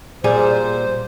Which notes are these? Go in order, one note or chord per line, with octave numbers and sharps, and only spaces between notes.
A#2 G3 G#4 C5